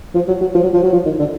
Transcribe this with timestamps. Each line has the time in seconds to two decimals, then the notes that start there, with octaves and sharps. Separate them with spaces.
0.15 F3
0.28 F#3
0.41 F#3
0.55 F3
0.63 F#3
0.73 F3
0.83 F#3
0.93 F3
1.05 D#3
1.19 D3